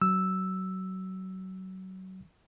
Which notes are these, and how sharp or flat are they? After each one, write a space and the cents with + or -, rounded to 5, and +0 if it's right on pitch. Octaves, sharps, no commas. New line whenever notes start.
F#3 +25 E6 +0